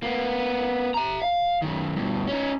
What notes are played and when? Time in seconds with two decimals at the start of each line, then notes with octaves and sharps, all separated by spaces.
0.03 A#3 B3
0.94 E5 A#5
1.22 F5
1.62 F#2 D#3
1.96 G2 B2
2.27 C#4 D#4